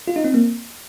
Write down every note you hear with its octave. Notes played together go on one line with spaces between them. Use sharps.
F4
D#4
C4
A#3